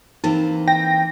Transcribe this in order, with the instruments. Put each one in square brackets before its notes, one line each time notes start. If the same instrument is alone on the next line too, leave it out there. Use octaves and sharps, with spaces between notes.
[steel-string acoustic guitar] E3 A#3 C4 [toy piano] D#4
[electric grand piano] G5 [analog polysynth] A#6